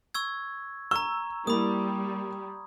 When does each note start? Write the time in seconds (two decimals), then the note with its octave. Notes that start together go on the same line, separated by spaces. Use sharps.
0.14 C#6 E6 G#6
0.91 A#5 C#6 E6
1.47 G3 A#3 E4 B5 D#6